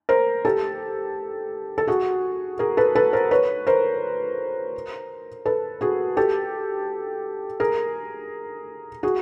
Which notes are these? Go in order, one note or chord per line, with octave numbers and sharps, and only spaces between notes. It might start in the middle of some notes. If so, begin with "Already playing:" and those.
A#4 C5
G4 A4
A4
F#4 G#4
G#4 A#4
A4 B4
A4 B4
A#4 C5
B4 C#5
A#4 C5
A4 B4
F#4 G#4
G4 A4
G#4 A#4
F#4 G#4